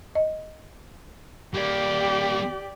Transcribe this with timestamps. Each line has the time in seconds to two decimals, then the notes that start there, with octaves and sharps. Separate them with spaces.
0.15 D#5
1.55 G3 A#3 G4 D5